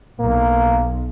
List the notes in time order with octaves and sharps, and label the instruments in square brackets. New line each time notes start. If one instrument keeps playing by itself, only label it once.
[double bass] B1 [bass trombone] A#3